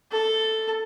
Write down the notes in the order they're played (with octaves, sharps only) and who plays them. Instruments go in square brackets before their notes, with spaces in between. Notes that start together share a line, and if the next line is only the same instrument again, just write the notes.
[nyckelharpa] A4